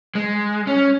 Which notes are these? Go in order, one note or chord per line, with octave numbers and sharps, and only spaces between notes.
G#3
C#4